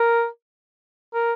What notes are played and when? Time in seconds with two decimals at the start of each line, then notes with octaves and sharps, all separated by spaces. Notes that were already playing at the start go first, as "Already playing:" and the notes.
Already playing: A#4
1.14 A#4